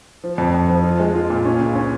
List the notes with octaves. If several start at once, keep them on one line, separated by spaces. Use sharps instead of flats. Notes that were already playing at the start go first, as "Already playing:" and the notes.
F3
F2
F2
F3
F4
G#3
F4
A#2
C#4
C#2
C#4